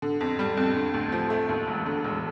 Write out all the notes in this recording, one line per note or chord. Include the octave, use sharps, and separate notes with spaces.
D3
F2
G3
F2
D3
D2
F3
A3
D#2
E1
D3
E1